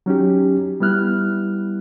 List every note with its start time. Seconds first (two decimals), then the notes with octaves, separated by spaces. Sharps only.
0.06 F#3 C#4 D#4 G4
0.80 G3 B3 E4 F6 F#6